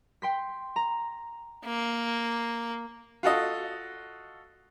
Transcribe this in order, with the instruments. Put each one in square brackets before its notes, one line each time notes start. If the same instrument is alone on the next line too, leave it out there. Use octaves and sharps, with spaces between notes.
[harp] G5 C6 B6
A#5
[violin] A#3
[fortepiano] F4 F#4 A4 D#5